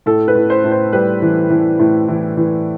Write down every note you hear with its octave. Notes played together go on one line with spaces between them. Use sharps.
A2 A4
B4
A2
C5
A2
C5
G3 B4
E3
E3
A2
E3
E3